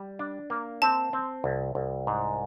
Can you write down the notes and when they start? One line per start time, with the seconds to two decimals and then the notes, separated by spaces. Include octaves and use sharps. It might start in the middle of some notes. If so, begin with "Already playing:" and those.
Already playing: G3
0.19 D4
0.50 A#3
0.82 C4 A5
1.13 C4
1.44 C2
1.75 C2
2.07 G#2